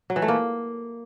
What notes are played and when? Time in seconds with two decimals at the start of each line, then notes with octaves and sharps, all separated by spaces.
0.10 F#3
0.16 E3
0.22 A3
0.28 A#3